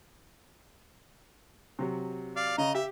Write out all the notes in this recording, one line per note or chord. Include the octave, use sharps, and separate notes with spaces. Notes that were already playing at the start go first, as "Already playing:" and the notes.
C3 F#3
D5 F5
C#3 D#5 A#5
G4 E5